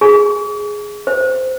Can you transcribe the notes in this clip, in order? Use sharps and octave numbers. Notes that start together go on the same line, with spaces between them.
G#4
C5